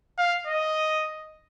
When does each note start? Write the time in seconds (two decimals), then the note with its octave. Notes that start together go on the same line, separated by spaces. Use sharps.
0.18 F5
0.47 D#5